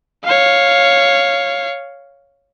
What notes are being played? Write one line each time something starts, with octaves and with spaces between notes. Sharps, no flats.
C#5 F5